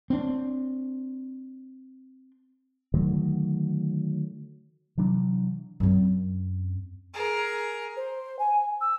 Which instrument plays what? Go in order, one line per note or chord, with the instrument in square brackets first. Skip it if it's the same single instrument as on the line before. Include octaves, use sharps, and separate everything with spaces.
[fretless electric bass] C4 D4
[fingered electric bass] D3 D#3 F#3 A3
C3 E3 F#3 D4
[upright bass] F#2 C4
[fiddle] G#4 A#4
[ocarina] C5
G#5
E6